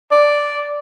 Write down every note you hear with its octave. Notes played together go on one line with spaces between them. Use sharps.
D5